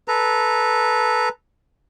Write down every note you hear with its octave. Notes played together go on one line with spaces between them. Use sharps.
A4 B4 A#5